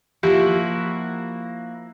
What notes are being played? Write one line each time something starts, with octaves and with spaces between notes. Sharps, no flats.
F3 A#3 E4 F#4 G4